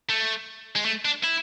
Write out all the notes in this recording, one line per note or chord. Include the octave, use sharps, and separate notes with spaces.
A3
G#3
A3
D4
E4